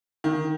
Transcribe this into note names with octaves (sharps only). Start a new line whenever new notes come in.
D#3